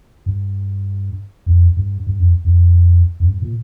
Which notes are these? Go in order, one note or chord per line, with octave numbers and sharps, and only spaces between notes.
G2
F2
G2
G2
F2
F2
F2
G2
A#2